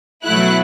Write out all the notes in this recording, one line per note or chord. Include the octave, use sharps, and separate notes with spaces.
B2 F#3 A3 E4 F#6